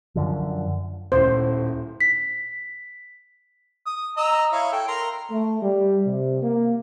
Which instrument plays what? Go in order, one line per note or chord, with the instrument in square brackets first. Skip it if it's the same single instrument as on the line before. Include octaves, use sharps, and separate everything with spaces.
[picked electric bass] F#2 D3 F3
[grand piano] D#1 A2 [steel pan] C5
[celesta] B6
[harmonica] D#6
D#5 A#5 E6
E4 C#5 F5
A4 G5
A#4 A#5 C6
[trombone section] A3
G3
C3
A#3